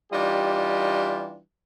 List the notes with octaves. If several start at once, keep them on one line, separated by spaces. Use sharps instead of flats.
E3 G3 D4 D#4 F4 G4